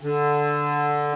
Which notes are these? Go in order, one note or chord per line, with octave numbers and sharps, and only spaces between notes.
D3